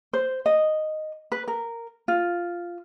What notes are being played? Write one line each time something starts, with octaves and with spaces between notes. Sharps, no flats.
C5
D#5
B4
A#4
F4